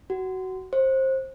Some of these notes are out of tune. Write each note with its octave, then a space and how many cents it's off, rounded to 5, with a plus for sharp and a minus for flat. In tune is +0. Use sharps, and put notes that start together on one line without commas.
F#4 +20
C5 +20